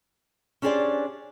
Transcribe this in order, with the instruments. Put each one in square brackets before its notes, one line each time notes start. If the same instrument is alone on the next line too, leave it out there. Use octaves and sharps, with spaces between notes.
[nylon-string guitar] C#4 D4 G4 G#4 C5 D5